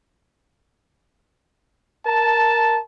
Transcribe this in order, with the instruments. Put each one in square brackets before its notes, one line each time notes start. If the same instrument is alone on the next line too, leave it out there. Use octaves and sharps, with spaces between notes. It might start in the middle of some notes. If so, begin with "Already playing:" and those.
[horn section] A#4 A5